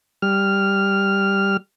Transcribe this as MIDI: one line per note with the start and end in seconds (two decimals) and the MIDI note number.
0.22 1.57 55
0.22 1.57 89